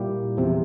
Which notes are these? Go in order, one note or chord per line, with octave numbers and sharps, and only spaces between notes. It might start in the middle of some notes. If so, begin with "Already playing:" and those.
Already playing: A#2 G3 A#3 E4 G4
E2 C3 F3 C4